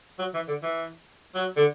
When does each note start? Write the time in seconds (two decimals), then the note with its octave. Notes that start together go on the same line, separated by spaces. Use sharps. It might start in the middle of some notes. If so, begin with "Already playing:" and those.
0.19 F#3
0.34 E3
0.48 D3
0.62 E3
1.35 F#3
1.56 D3